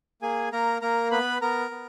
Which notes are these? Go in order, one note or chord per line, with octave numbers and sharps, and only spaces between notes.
A#3 G#4 G#5
A#3 A#4 A#5
A#3 A#4 A#5
B3 B4 B5
B3 A#4 A#5
B3